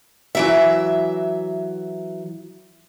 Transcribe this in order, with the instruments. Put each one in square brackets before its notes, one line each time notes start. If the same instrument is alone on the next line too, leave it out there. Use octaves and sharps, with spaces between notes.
[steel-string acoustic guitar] E3 F#3 E5